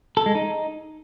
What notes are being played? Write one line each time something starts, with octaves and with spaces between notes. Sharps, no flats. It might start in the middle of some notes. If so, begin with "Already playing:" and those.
A4
G#3
D#4